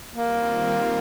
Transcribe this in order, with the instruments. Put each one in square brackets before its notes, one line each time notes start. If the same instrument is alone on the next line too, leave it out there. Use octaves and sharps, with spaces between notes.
[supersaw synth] D#3 G3 C4 F4 [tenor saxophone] A#3